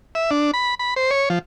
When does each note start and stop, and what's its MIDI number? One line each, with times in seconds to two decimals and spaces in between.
0.15 0.30 76
0.31 0.51 62
0.54 0.75 83
0.79 0.94 83
0.96 1.10 72
1.11 1.29 73
1.30 1.39 53